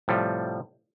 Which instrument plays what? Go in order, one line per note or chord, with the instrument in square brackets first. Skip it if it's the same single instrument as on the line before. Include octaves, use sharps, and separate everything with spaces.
[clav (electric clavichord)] A2 C3 F3 G3